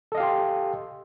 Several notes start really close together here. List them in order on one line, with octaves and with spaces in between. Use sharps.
A4 D#5 F5 G4 C6